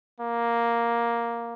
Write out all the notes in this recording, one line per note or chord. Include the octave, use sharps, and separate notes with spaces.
A#3